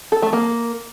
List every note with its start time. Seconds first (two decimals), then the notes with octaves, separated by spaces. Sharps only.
0.12 A4
0.22 A3
0.33 A#3